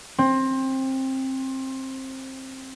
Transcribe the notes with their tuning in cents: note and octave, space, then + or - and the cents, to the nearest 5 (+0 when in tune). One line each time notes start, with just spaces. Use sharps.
C4 +20